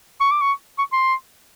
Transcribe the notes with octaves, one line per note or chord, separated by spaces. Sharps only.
C#6
D6
C#6
C#6
C6